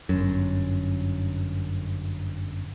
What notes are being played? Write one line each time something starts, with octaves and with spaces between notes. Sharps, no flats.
G1 F#2